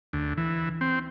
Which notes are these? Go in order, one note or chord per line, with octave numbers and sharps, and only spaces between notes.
D2
E3
C4